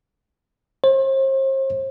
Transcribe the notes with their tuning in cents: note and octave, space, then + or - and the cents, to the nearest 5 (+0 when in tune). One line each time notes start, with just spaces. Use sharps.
C5 +40